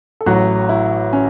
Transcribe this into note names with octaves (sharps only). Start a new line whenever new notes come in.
A4
A1 A2 F#3 F#4
E4
C#4